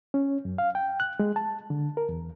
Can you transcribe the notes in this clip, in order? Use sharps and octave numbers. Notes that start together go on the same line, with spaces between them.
C#4
F#2
F5
G5
F#6
G#3
A5
D3
A#4
E2